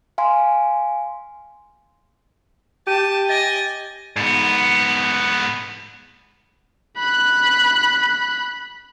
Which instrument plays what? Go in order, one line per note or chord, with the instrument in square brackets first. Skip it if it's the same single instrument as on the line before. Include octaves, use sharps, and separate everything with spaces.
[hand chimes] F5 G#5 C6
[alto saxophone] G4 [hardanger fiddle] A5 [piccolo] D#7
[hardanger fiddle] D#5 G#5 [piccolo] A6
[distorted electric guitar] G#2 B3
[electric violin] B5 F#6